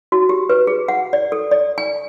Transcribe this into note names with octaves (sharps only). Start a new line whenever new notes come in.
F#4
G4
B4
G#4
F#5
D5
A4
D5
G#5